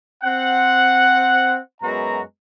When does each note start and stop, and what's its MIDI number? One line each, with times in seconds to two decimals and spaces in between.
0.24 1.58 60
0.24 1.58 78
1.82 2.21 42
1.82 2.21 56
1.82 2.21 59
1.82 2.21 66
1.82 2.21 82